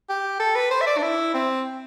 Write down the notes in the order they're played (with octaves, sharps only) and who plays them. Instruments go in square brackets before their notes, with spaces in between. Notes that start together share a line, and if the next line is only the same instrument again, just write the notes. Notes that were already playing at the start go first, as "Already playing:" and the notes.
[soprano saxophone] G4
A4
B4
C5
E5
D5
D4
E4
C4